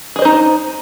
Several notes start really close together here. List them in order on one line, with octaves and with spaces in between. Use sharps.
G#4 D#5 C5 D#4